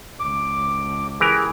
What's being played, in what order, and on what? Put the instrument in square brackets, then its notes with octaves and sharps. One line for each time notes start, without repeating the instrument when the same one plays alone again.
[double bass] C#2 [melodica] D6
[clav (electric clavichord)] E3 G4 A#4 [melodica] G#4